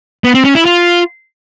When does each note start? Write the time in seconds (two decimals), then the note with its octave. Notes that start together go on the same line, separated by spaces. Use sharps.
0.24 B3
0.34 C4
0.45 C#4
0.55 E4
0.65 F4